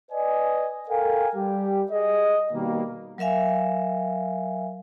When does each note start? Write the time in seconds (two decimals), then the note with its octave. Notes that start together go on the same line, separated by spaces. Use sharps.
0.12 B4 D5 D#5 G#5
0.89 A4 A#4 F5 G5 G#5
1.36 G3 G4
1.92 G#4 D#5
2.53 B2 D#3 G3 A#3
3.18 F#3 A#4 E5 F5 G#5